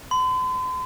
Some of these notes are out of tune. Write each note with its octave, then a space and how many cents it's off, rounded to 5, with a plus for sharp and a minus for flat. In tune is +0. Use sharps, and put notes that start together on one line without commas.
C6 -45